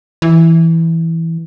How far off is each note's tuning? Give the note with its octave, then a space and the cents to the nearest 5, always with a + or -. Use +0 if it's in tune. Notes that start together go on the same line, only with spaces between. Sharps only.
E3 -5